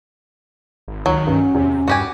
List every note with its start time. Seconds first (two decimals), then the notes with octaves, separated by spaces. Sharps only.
0.88 G#1
1.06 C#2 D#3 F#3
1.27 G2 C#4
1.55 E2 C3
1.88 G2 F#4 G4 G#5